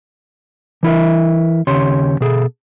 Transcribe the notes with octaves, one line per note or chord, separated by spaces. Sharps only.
E3 E4 A#4 E5
D#2 C#3 G4 C#5 C6
B2 G#4 A4